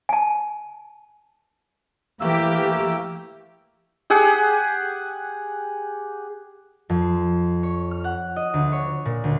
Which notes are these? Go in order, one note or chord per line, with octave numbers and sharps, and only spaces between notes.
G#5 A5
E3 A3 A#3 G4 E6
G4 G#4 F#5
F2
C6
C#5
F6
F#5
D#5
D2
C#5
A#2
D2